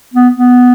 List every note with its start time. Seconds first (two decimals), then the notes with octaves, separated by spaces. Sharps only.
0.14 B3
0.36 B3